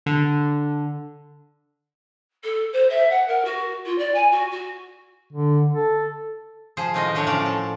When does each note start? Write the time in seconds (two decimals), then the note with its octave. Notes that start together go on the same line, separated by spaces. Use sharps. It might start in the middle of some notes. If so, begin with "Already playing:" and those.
0.06 D3
2.43 A4
2.72 C5
2.89 E5
3.10 F#5
3.28 A#4
3.44 F#4
3.85 F4
3.98 D5
4.14 G#5
4.31 F#4
4.51 F#4
5.33 D3
5.74 A4
6.77 F3 G#4 C5
6.94 A2 D#3 D#4 F4 F#4 D#5
7.15 D3 F#3 A3 D4 C#5
7.27 A2 F3 C#4 A#4 D5 F5
7.46 A4